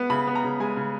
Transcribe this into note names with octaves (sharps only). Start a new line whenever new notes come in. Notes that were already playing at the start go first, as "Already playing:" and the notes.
Already playing: B3
C#3 B5
B3
A#5
C#3
G#3 G#5
C#3